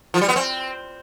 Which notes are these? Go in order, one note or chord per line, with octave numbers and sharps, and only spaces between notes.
F3
G3
B3
C4